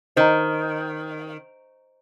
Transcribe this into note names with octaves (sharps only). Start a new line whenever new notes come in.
D#3 C5 D#5 A#5